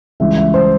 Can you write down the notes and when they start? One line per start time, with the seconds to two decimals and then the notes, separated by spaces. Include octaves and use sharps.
0.20 C#2 C#3 E3 G3 E5
0.37 E5
0.54 C5